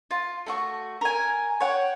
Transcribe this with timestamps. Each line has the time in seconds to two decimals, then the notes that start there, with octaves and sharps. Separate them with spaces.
0.11 F4
0.46 A3 F#4 C#6
1.01 A#4 G#5
1.60 C#5 F#5 G5